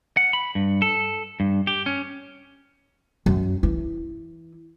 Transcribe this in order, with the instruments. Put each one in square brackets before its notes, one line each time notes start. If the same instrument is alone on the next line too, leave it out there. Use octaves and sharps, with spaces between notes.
[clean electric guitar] F#5
B5
G2
A4
G2
G4
C#4
[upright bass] F#2
E3 E4